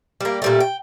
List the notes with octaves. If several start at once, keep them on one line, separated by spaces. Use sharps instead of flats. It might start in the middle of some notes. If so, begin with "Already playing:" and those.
G3 A#3
A#2 G3 A3
G5